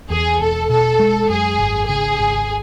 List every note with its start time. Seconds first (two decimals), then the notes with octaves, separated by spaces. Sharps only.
0.10 E2 G#4
0.40 E1 A4
0.70 B2 A4
0.99 G#3
1.29 F#2 G#4
1.59 G#1
1.88 C#3 G#4
2.19 G#1